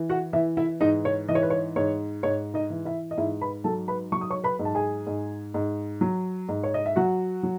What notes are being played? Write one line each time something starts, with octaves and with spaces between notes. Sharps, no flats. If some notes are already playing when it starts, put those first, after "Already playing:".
Already playing: E3
F#4 F#5
E3 E4 E5
E4 E5
G#2 D#4 D#5
C#5
E3 D#5
C#5
B4
C#5
G#2 C#5
G#2 C#5
D#4 D#5
E3
E4 E5
D#5
G#2 E4 E5
B4 B5
F#3 A4 A5
B4 B5
F#3 C#6
D#6
C#5 C#6
B4 B5
G#2
A5
G#4 G#5
G#2
G#2
F#3
G#2
C#5
D#5
E5
F#3 F#4 F#5
F#3